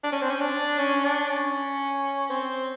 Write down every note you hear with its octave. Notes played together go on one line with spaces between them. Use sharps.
D4
C#4
C4
C#4
D4
C#4
D4
C#4
C4